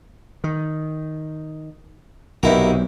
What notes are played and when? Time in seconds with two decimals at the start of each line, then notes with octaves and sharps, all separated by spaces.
0.44 D#3
2.43 B1 G2 C3 C4 D#4 E4 F#4 A#4